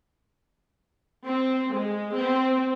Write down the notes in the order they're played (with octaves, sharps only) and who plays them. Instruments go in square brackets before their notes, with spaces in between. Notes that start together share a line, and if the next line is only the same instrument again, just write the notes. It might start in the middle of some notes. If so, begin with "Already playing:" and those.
[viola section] C4
G#3
C4